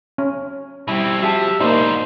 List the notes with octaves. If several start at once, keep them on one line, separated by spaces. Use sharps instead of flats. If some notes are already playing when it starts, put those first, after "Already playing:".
C#4
B2 G3 C4 E4
F3 F#4 G4 E5 A5
G#2 B2 A#3 D#4 C5 D5